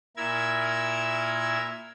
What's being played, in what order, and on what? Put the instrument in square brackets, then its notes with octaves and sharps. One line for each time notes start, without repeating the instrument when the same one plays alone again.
[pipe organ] A#2 E4 A#4 E6 G#6